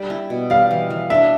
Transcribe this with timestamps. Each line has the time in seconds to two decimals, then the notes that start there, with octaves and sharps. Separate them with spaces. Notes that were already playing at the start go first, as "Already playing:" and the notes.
Already playing: G3 D4
0.10 E4
0.30 B2
0.50 G3 F5
0.71 E3
0.90 E3
1.10 D4 E5